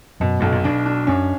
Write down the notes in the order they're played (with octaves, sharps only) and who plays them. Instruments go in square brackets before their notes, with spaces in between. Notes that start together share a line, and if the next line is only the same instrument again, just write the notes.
[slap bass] F#2 [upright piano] B2
[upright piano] B1 [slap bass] G2
[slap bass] A#2
[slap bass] B2 [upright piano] D4
[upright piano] D4
[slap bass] F#2 [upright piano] C#4